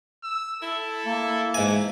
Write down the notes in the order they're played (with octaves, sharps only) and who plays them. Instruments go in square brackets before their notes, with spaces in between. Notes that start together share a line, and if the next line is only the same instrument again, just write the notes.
[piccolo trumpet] E6
[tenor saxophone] E4 [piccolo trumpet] A4
[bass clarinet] A#3
[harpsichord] G#2 G#5 [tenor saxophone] E3 [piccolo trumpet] E5